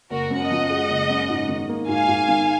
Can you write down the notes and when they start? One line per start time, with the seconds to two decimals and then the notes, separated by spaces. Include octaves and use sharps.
0.10 F#1 F#4 A#4
0.30 F#2
0.40 D#5 F#5
0.50 F3
0.70 G#3
0.90 F#1
1.09 F#2
1.30 G#2
1.49 D#3
1.69 A#3
1.88 G#2 F5 G#5
2.08 G#2
2.28 D#3